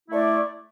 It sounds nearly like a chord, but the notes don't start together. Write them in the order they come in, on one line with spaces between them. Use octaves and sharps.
E4 A3 D5